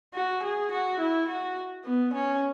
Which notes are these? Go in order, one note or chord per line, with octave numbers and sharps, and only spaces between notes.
F#4
G#4
F#4
E4
F#4
B3
C#4